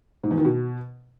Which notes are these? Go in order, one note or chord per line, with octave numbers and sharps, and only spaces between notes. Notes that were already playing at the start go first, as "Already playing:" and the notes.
G#2
E2
D#3
B2